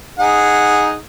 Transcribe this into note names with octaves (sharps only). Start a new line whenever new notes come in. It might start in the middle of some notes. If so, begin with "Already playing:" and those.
D#4 G#4 F#5